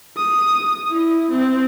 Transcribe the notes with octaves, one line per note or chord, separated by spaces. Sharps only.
D#6
E4
C4